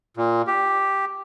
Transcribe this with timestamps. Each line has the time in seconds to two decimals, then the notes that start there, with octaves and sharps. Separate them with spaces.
0.17 A#2
0.47 G4